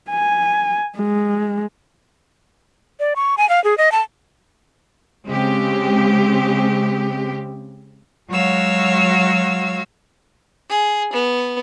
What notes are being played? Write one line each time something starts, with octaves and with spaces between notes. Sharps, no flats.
G#5
G#3
D5
C#6
G#5
F5
G#4
D#5
A5
C#3 G#3 C4 G4
F#3 G#3 F#4 C#5 F5 E6
G#4
B3